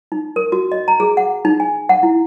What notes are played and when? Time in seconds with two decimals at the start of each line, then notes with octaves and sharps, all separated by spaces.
0.12 D#4
0.36 A#4
0.52 F#4
0.72 D#5
0.88 A#5
1.00 G#4
1.17 F#5
1.45 D#4
1.60 G#5
1.89 F#5
2.03 E4